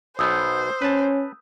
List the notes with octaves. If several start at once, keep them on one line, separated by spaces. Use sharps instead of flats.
B1 B2 B3 C5 D#6 E6 G6
C#4 B4 A5